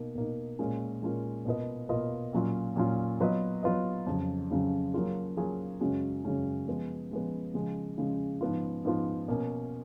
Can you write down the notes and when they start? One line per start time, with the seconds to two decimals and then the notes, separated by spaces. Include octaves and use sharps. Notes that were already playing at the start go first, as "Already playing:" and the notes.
Already playing: B2 A#3 D#4
0.15 B2 A#3 D#4
0.59 A#2 G#3 C#4 F4 A#4
1.02 A#2 G#3 C#4 F4 A#4
1.45 B2 A#3 F4 B4 D#5
1.89 B2 A#3 F4 B4 D#5
2.33 A#2 F#3 C#4 F4
2.76 A#2 F#3 C#4 F4
3.20 F#3 B3 F4 B4 D#5
3.63 F#3 B3 F4 B4 D#5
4.07 F2 C#3 F#3
4.50 F2 C#3 F#3
4.94 F#3 A#3 F4 G#4
5.37 F#3 A#3 F4 G#4
5.80 F#2 C#3 G#3 C#4 F#4
6.24 F#2 C#3 G#3 C#4 F#4
6.68 F3 G#3 B3
7.11 F3 G#3 B3
7.54 C#3 F3 G#3
7.98 C#3 F3 G#3
8.41 G#2 F3 B3 F4
8.85 G#2 F3 B3 F4
9.28 B2 A#3 C#4